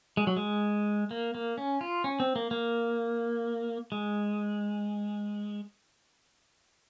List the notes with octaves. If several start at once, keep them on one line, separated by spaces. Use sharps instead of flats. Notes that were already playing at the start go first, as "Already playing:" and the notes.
G#3
F#3
G#3
A#3
A#3
C#4
F4
C#4
C4
A#3
A#3
G#3